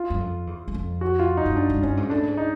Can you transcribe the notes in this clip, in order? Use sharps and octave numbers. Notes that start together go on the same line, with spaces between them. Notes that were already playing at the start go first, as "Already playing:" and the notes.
Already playing: F4
F#2
F2
E2
E2
F2
F#4
F4
D#4
G2
F#2 D4
G2
G2 C#4
G#2
A2 D4
G#2
D#4